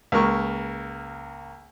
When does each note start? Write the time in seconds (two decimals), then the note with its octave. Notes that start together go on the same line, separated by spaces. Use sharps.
0.12 C#2 A#3 A#4 C#6